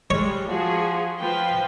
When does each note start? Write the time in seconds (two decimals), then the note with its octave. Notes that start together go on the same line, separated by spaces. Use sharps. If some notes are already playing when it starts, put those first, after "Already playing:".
0.10 G3 G#3 C#5
0.49 F3 F#4 G#4
1.21 F3 B4 G5